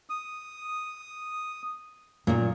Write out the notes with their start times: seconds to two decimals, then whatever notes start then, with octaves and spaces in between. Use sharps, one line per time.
0.10 D#6
2.27 F#2 A#2 D#3